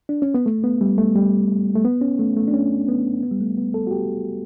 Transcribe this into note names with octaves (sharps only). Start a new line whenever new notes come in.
D4
C#4
B3
A3
B3
G3
A3
G3
A3
B3
C#4
A3
A3
D4
C#4
B3
B3
G3
A3
B3
A4
F#4
G4